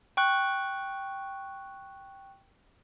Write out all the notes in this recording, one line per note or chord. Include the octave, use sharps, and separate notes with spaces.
G5 C#6 F#6